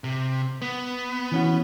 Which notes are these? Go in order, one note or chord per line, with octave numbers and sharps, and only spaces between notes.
C3
B3
E3 C#4 F#4